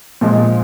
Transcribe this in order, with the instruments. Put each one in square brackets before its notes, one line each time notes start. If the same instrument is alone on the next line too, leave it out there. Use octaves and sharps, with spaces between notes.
[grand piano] A#2 F3 G#3